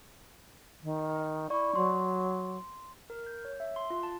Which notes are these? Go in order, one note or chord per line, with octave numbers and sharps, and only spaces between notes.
D#3
E4 D5 C#6
F#3 C6
A#4
G6
C#5
E5
C6
F4
A5